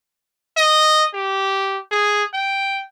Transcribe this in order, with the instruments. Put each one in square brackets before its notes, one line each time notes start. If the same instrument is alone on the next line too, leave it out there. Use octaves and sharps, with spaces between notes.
[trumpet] D#5
G4
G#4
G5